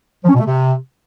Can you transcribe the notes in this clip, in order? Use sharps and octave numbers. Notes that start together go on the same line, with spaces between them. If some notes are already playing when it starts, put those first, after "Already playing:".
F3
C#4
B2
A3
C3